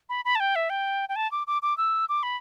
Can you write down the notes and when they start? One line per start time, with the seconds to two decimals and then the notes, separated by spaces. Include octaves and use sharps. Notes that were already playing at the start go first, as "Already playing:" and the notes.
0.09 B5
0.25 B5
0.35 A5
0.40 G5
0.55 E5
0.70 G5
1.09 G5
1.16 A5
1.31 D6
1.47 D6
1.62 D6
1.77 E6
2.09 D6
2.23 B5